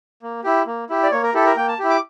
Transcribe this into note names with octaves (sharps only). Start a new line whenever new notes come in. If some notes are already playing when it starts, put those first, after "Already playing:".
A#3
E4 G4
A#3
E4 G4
D5
A#3 C#5
A#4
E4 G4 A4
A#4
A#3 G5
A5
E4 G4
D6